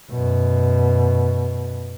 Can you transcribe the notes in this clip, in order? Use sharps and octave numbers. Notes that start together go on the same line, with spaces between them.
F#2 B2